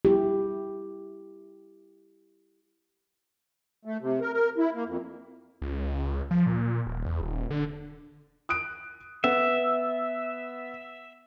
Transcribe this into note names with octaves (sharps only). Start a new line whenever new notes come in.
E4 G4
A3
C3
A#4
A#4
E4
A#3
F2
C#2
F3
A#2
D#1
E2
D#1
D3
D#6 F#6 D7
B3 E5